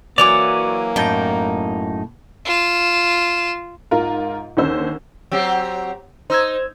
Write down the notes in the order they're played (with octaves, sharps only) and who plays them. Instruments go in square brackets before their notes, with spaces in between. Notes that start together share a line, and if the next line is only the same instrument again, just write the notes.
[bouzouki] E3 F#3 C#4 [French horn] A#3 [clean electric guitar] D5 [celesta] D6 F7
[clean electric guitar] F#2 D#4 [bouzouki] A2 G5
[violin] F4 E7
[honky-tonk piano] G#2 F4 A#4
D#2 D3 C#4 C5 E6
[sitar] F#3 C4 G4
[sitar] D#4 [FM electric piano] C5 E6 G#6